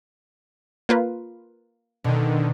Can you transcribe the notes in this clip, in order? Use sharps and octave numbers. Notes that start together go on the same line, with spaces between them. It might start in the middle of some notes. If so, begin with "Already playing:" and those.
A#3 F4 B4
B2 D3 D#3